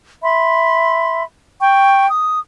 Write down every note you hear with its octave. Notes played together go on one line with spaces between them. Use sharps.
E5 B5 C6
G5 C#6
D#6